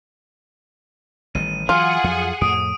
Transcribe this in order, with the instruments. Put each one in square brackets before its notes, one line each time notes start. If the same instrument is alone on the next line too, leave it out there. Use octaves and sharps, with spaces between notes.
[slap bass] A1 D#3 G3 [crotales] D#7
[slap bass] E3 F#3 [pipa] F4 [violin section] G#4 F#5
[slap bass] F2 F3 F#3
[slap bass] F2 A2 [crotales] D#6 D7